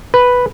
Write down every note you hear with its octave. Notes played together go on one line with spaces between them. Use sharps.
B4